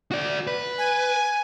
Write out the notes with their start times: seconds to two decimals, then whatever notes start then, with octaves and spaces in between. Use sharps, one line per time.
0.11 F#4 D5
0.47 B4
0.78 G#5